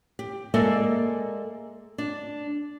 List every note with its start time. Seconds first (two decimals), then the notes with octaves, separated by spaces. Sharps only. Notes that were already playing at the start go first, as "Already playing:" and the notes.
0.19 G4
0.54 G#3 A#3 A4 D5 E5
1.98 D4